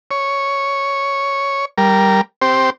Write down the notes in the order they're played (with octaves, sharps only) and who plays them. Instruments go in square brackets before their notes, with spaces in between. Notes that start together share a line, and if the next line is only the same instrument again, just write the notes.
[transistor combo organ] C#5
G3 A#4
C4 G4 C5